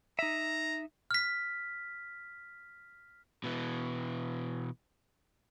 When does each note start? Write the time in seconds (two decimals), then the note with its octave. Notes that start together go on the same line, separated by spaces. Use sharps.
0.19 D#4 E5 A#5
1.11 F6 B6
3.44 B2 E3